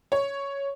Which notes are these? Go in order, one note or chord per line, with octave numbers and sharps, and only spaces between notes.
C#5